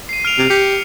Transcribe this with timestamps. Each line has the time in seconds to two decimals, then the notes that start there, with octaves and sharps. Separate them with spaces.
0.09 C7 D#7
0.25 F6 D7 F7
0.38 C3
0.50 G4 C#7